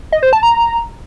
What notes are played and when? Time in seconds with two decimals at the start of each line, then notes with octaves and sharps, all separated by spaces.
0.12 D#5
0.23 C5
0.33 A5
0.43 A#5